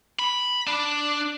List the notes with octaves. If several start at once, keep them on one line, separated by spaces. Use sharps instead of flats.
B5
D4